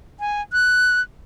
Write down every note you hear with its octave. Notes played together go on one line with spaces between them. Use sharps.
G#5
F#6